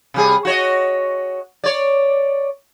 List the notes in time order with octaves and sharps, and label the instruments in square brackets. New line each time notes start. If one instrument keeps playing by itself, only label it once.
[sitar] C3 G3 G#4
F#4 C#5 D#5
C#5 D5